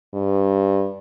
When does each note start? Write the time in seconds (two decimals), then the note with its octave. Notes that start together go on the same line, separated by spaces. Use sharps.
0.14 G2